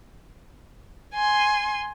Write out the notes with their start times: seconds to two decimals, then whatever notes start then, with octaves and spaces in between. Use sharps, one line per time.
1.14 G#5 C6